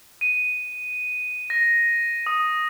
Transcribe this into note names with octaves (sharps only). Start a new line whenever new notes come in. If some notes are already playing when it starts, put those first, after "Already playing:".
D#7
A#6
D#6